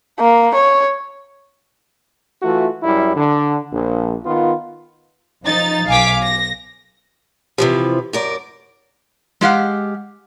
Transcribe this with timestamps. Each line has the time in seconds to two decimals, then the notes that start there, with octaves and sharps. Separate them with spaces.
0.20 A#3
0.54 C#5
2.42 E3 A3 F4 F#4
2.83 F#2 G3 E4
3.15 D3
3.72 A#1
4.24 D#3 B3 F4
5.44 F3 D#4 A6
5.88 B1 F5 G#5 D6 B6
6.22 A#6
7.58 C3 E3 F3 G4
8.13 F#2 A#4 D5
9.41 G#3 G4 F5 F#5